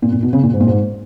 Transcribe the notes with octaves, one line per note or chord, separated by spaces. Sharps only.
A#2
A#2
B2
C#3
A#2
G#2
A#2
G#2